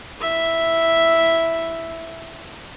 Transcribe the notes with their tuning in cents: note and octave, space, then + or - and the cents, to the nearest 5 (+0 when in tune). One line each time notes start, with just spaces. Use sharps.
E4 +0 E5 +0